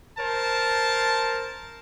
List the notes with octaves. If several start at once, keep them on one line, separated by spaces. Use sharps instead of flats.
A#4 C5 A5